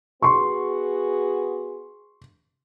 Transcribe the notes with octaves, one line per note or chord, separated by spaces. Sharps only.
B3 F#4 G#4 C6 C#6